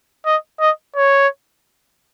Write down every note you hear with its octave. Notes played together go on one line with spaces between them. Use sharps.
D#5
D#5
C#5